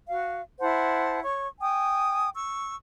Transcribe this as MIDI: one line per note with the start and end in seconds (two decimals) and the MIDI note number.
0.08 0.41 66
0.08 0.41 77
0.60 1.20 64
0.60 1.20 72
0.60 1.20 78
0.60 1.20 81
1.22 1.47 73
1.22 1.47 85
1.60 2.29 79
1.60 2.29 80
1.60 2.29 87
2.35 2.76 85
2.35 2.76 88